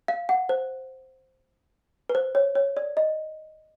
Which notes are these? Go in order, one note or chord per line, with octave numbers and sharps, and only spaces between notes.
F5
F#5
C5
B4
C5
C#5
C#5
D5
D#5